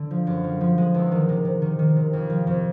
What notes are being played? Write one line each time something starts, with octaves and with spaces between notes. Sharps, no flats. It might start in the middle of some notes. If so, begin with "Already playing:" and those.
Already playing: D3
F3
F#2
F3
F3
G#3
E2
D#3
C3
C3
D#3
D#3
C3
F2
F3
F2